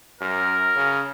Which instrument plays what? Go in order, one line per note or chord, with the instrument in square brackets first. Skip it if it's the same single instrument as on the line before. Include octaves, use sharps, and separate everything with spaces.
[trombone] F#2 [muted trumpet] A#4
[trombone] C#3